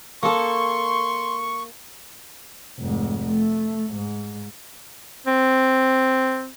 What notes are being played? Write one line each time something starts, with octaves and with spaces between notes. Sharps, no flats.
A#3 A4 C6 C#6
F1 G#2
A3
G#2
C4